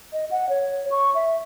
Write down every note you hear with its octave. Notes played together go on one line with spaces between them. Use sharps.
D#5
F#5
C#5
C#6
E5